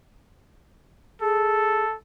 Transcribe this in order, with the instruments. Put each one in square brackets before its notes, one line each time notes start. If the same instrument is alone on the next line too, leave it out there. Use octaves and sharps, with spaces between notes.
[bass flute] G#4 [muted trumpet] A4